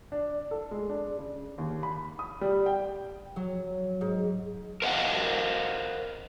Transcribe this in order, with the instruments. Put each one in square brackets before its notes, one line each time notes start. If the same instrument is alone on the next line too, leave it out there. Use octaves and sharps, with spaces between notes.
[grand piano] D4
A4
G#3
D4
C#3
D#2
B5
D#6
G3
G5
[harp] F#3
G#2
[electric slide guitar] A#4 C5 D#5 F5 F#5